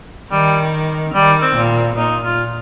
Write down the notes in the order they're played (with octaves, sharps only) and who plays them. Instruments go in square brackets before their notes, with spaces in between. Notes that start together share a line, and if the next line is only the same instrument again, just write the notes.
[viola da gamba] D#3 [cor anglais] G3
[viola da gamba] D#3 [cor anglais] G3
[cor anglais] C4
[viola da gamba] A#2
[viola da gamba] A#2 [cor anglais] D#4
[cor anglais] F4